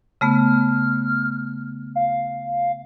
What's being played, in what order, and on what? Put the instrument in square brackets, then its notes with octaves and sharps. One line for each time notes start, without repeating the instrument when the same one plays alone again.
[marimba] C#3 A3 B3 [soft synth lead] F6
[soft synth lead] F5